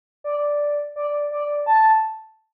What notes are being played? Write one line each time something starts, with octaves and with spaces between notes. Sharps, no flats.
D5
D5
D5
A5